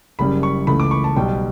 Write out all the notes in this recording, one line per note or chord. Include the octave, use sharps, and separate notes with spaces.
F#1 F#2 C#3 G3 B5
C#6
C#2 C#3 E3 A3 B5
D6
C#6
A5
B1 B2 G3 G5